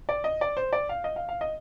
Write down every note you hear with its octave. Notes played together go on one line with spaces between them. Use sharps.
D5
D#5
D5
C5
D5
F5
D#5
F5
F5
D#5